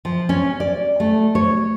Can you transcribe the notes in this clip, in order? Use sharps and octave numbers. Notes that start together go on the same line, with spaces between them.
F3
C#4
D5
A3
C#5